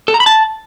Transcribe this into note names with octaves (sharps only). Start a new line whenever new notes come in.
A4
A#5
B5
A5